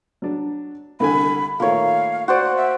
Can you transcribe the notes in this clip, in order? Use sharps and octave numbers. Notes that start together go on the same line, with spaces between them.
F#3 D4
C2 D3 G#5 B5
A#2 D#3 A3 A#3 C#5 F5
F#4 C5 D5 F#5
E5